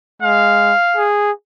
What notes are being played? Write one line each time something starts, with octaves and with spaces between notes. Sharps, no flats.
G#3 F5
G#4